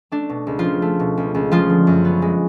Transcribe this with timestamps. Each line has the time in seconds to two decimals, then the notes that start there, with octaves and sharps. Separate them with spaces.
0.12 A3 D4
0.30 B2
0.47 C#2
0.59 F3 F4
0.64 C#2
0.82 A3
1.00 B2
1.17 C#2
1.34 C#2
1.52 F3 G#3 F4
1.70 D3
1.87 F#2
2.05 B3
2.22 G#3